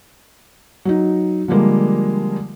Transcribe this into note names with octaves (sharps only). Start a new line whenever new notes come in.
F#3 D#4
D3 F3 G3 G#3 A#3